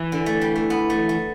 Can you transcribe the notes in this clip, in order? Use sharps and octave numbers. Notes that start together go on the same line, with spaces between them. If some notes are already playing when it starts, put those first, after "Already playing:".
Already playing: E3
D3
A3
G3
A3
B3
A3
A3